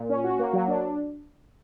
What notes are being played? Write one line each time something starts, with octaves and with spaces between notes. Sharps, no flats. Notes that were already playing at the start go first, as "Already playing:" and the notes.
Already playing: A#2
C#4
F#4
A#3
F#3
D4